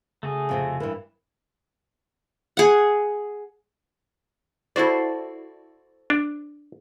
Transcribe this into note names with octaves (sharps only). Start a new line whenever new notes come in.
C#3 A3 F#4 G#4
F2 C3 C4
G2 E3 E4 A#4
G#4 F#5
E4 F#4 A4 C5 D5
D4